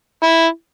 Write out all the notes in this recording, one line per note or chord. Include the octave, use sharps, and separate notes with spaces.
E4